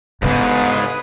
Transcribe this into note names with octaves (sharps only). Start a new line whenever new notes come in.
G1 D#2 G#2 C#3 B3 B4 D#6